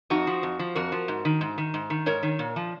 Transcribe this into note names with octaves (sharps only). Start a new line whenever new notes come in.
F2 D#4 F#4
F3
F2
F3
F2 F#4 A#4
F3
G#2
D#3
G#2
D#3
G#2
D#3
G#2 A#4 C#5
D#3
A#2
F3